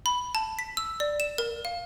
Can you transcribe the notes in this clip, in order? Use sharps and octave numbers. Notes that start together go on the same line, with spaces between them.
B5
A5
B6
E6
D5
E7
A#4
F5